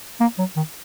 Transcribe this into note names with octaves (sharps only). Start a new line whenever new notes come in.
A#3
F#3
D#3